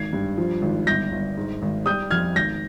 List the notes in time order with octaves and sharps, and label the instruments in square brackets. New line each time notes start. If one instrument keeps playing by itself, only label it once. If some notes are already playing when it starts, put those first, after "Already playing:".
Already playing: [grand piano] G#1 G#6 C7
G2
F3
G#1
G1 G6 A#6
G1
G#2
G#1
G3 D#6 G6
F2 F6 G#6
G#1 G6 A#6